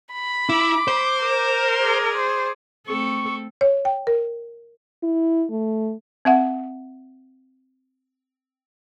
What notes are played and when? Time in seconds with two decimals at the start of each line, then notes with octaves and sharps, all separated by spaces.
0.14 B5
0.49 E4 D6
0.88 C5
1.23 A#4
1.81 G#4 D5
2.17 C5
2.87 A3 C4 A4 C#6
3.61 C#5
3.85 G5
4.07 A#4
5.03 E4
5.50 A3
6.25 C4 E5 F#5